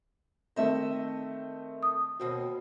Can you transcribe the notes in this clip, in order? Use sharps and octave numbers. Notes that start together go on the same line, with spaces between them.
D#3 A3 C4 D#5 E5
D#6
D#2 B2 C4 F#4